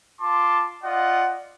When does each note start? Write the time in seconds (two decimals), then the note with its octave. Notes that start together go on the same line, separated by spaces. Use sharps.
0.20 F4 A5 C6 D6
0.83 F4 D5 D#5 F#5